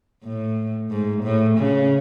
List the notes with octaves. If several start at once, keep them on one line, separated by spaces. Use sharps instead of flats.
A2
G#2
A2
C#3